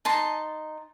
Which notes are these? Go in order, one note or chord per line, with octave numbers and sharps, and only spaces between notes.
D#4 A5 C6